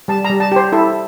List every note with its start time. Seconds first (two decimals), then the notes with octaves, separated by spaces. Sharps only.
0.08 G3 A5
0.25 A#5
0.30 G3
0.40 A5
0.52 G4 C5
0.72 E4 A4